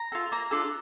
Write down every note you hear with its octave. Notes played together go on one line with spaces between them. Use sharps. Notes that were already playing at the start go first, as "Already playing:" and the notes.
Already playing: A#5
F4 A4
A#3 A#5
D4 F4 A4